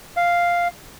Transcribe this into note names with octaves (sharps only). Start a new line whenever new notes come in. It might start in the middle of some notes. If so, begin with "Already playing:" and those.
F5